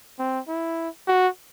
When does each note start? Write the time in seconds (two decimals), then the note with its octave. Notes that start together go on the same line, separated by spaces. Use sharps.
0.19 C4
0.48 E4
1.07 F#4